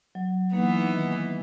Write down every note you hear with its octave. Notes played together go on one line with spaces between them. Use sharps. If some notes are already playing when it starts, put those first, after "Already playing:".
F#3
E3 A#3 B3 D#4 F#5
D#3 A#3